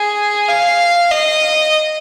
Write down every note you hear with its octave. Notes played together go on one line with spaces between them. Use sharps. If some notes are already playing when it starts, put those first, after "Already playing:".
Already playing: G#4
F5
D#5